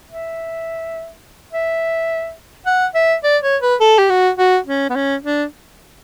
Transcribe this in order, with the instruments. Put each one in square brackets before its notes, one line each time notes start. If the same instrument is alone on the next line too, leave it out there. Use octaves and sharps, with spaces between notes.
[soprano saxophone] E5
E5
F#5
E5
D5
C#5
B4
A4
G4
F#4
F#4
C#4
B3
C#4
D4